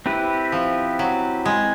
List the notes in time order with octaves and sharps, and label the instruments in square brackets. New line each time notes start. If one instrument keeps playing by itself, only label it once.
[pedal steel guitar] C4 E4 G4 B4
[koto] F3
F#3
G#3